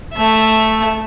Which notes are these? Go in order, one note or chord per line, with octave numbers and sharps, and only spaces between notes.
A3 E5